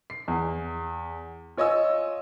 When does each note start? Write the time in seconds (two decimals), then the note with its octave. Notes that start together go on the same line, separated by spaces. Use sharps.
0.10 C7
0.28 E2
1.57 F4 C#5 D#5 G#5 E6